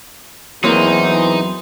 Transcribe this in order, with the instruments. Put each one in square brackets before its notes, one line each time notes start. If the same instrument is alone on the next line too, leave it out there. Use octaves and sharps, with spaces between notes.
[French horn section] E2 E3 E4 [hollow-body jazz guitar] F#3 A#3 C4 [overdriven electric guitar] D#4 [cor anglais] C5